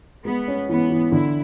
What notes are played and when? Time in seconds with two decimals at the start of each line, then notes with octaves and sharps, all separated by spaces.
0.25 G#3 B3
0.48 C#4
0.69 E3 B3
0.90 E3
1.12 D3 E4